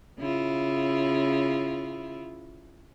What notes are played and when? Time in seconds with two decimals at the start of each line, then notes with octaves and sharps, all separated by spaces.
0.18 C#3 E4 F4